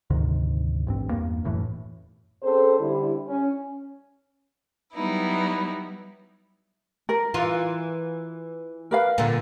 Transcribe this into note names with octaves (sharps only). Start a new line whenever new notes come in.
D2 G#2 C3 D#3
A1 G2 C4
E2 G2 A#3
D#1 F#2 A2 E3
C4 C#4 G#4 A4 C5
D3 G3 E4
C#4
F#3 G3 B3 D#4 E4
A#4
E3 F4
A#4 B4 F5
A#2 D3